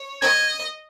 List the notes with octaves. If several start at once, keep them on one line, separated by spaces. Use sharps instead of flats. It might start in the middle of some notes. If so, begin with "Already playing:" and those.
Already playing: C#5
D#5 G#6